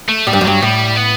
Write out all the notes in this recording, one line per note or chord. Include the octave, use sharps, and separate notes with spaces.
A3
A2 G3
G2
F#2
G2 F#3
A2 G3
B3